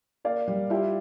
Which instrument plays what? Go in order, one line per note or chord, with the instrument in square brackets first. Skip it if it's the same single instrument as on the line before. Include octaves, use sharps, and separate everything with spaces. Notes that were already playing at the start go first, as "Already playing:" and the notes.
[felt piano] A#3 [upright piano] D5 F5
[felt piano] G3
[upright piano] E4 G4 [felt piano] F4